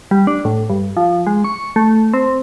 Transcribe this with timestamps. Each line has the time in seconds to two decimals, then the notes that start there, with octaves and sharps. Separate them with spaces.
0.11 G3
0.27 D4
0.45 A2
0.70 G2
0.97 F3
1.27 G#3
1.44 C#6
1.76 A3
2.14 C4